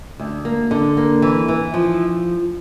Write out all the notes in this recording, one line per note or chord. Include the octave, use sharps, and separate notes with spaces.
D2
A#3
D3
A#3
E3
E3
F3